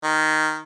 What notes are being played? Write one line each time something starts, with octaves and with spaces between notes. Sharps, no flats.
D#3